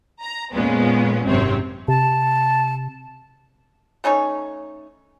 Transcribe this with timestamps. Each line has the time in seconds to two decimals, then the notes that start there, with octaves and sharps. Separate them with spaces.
0.21 A#5
0.53 F2 A#2 G#3 B3 C#4
1.26 G#1 F#2 C3 C4 C#5
1.88 C3 A5
4.04 A3 C#4 D#4 C#5